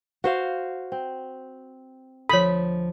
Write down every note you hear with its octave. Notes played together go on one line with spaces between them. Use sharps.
F#4 C5 F5
C4
D2 F3 A4 C#5 B5